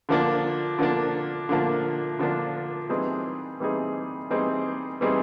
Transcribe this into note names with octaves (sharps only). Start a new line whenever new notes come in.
D3 F3 A#3 D4
D3 F3 A#3 D4
D3 F3 A#3 D4
D3 F3 A#3 D4
E3 G3 C4 D#4 G#4
E3 G3 C4 D#4 G#4
E3 G3 C4 D#4 G#4
E3 G3 C4 D#4 G#4